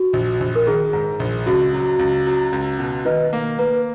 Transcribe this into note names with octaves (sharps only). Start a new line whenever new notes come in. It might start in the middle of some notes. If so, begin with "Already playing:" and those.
Already playing: F#4
A#1
A#1
A#4
D#3 G#4
G#2
A#1
C#2 F#4
F#3
C#2
F#3
C#2
B2
D#3 B4 D#5
A#3
A#3 B4